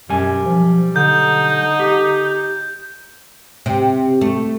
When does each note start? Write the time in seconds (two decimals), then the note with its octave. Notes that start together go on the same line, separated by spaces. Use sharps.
0.09 B1 F#2 G3 G#5
0.46 F3
0.96 D3 D#4 G6
1.80 G4
3.66 C3
4.21 A3